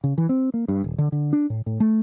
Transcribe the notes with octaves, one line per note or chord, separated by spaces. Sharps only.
C#3
E3
C4
A#3
G2
D#1
D3
D3
D4
A2
A2
A3